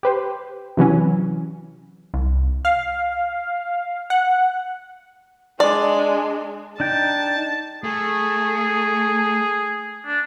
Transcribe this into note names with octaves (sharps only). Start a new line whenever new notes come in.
G4 B4 C5
C3 E3 F#3 C#4
C2
F5
F#5
G#3 D4 D5
D4 D#4 G5 A5
A3 G#4
D4